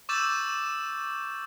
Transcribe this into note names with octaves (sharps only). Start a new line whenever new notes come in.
C#6 D6 E6 G6 A6 E7